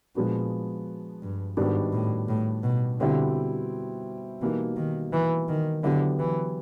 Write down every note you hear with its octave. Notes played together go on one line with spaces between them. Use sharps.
A#2 F3 G#3 B3 D4 F#4
G2
G#2 D#3 G3 B3 D4 F#4
A2
A2
B2
B2 D3 G3 C4 E4 G4
B2 E3 G3 A#3 D#4
D#3
E3
D#3
D3 F#3 B3 E4 G4
E3